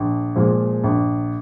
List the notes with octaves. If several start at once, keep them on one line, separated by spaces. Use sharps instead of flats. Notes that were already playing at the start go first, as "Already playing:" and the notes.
Already playing: A#1
A#2 F3 G#3
A#1